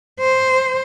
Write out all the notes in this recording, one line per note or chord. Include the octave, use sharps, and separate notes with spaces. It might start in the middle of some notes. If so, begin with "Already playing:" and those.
C5